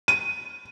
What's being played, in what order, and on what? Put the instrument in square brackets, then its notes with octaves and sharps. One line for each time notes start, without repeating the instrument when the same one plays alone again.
[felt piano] D#7